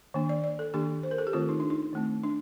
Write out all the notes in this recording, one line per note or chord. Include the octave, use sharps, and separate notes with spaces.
D#3 A#3 D4
D5
D5
A4
D#3 A#3 D4 G4
C5
A#4
A4
G4
D#3 A3 C4 F4
D#4
D4
D#4
D#3 A3 C4
D4